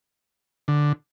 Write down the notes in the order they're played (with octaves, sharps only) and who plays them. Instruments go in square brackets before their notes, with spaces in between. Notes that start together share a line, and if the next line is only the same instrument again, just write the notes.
[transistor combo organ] D3